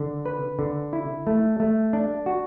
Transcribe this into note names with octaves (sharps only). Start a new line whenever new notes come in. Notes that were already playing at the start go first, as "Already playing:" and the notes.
Already playing: D3
B4
D3
E4
A3
A3
D4
F#4